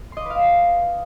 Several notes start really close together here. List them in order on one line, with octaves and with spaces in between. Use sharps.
C6 D#5 D6 B4 F5